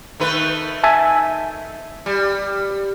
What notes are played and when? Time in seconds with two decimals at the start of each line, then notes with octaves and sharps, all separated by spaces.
0.20 D#3 A3 B4
0.83 E5 G#5 A5
2.06 G3